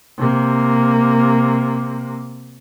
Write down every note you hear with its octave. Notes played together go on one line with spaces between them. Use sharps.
C3 A#3